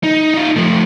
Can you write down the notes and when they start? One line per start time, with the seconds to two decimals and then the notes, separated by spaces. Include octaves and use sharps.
0.03 D#4
0.34 D#4 F4
0.56 F3 A3